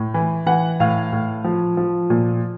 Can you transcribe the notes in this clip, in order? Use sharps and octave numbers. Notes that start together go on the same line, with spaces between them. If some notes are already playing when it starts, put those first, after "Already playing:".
Already playing: A2
E3
E3 F#5
A2 F5
A2
F3
F3
A#2